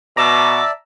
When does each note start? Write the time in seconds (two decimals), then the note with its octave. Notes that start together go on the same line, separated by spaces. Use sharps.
0.17 B2 D5 E5 A5 A#5 D6 E6